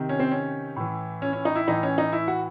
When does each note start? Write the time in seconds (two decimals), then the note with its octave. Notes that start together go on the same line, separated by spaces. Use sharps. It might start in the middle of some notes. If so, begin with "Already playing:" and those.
Already playing: C3 D#3
0.09 C#4
0.20 C4
0.31 C#4
0.76 A2 E3
1.22 C#4
1.33 C#4
1.45 D#4
1.55 E4
1.67 A2 E3 D#4
1.83 C#4
1.98 D#4
2.12 E4
2.28 F#4